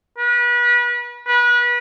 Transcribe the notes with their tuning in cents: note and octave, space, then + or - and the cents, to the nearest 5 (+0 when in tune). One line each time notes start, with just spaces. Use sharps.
B4 -35
B4 -30